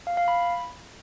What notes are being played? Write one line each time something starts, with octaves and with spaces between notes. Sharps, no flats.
F5
F5
B5